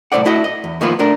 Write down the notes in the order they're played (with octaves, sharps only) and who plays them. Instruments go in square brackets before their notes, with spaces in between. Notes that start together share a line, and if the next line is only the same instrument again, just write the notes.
[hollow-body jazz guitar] C2 F#2 A2 C5 D5 F#5
A3 E4 F#4 D#5
D#5
E2
D#3 F3 A#3 B3 F4 B4
A3 D4 A#4